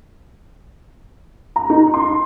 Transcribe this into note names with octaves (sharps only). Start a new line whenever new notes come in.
A#5
D#4
C6